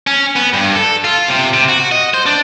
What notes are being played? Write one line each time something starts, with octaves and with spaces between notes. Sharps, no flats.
C#4
B3
G2
A4
F4
C3
C3
F#4
D#5
C5
D4